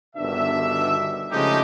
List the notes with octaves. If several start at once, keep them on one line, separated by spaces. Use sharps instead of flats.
G1 B2 D#3 D4 E5
C#3 F3 G#3 A3 D#4 G4